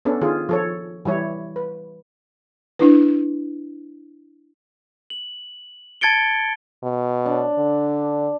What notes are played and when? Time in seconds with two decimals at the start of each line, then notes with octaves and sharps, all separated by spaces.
0.05 B3 C#4 D4 A4
0.21 D#3 F4 G#4
0.49 F3 A4 C#5
1.05 E3 G3 E4 C#5
1.56 B4
2.79 D4 E4 B4
5.10 F#7
6.01 A5 G#6 A6 C#7 D7 G7
6.83 B2
7.26 D4
7.58 D3